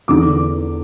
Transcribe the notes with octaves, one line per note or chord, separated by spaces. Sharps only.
E2 D3 D6